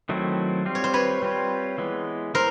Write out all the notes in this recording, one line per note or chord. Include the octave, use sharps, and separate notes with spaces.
D#3 F#3 A3 C4 E4
G3 C4 F4
C#5
C5
B4 C#5
G3 C4 F4
E3 G#3 B3
E3 A#4 C5